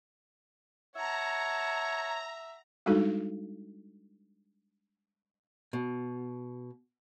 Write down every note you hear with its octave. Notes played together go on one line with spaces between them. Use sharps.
C#5 E5 F#5 A5 A#5
G3 G#3 D4 D#4 F#4 A4
B2